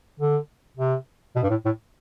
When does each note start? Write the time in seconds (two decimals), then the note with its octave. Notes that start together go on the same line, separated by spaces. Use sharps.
0.19 D3
0.77 C3
1.35 B2
1.43 G2
1.50 A2
1.65 A2